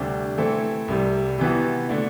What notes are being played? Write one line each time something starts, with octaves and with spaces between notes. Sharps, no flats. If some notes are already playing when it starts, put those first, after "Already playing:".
Already playing: D2 C3 G3 D4
E3 A3 C4 E4 A4
C2 C3 G3
C3 E3 B3 F#4
D3 A3 D4